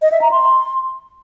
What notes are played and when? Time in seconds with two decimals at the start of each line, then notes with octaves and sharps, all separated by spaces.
0.02 D#5
0.12 E5
0.21 A#5
0.31 C6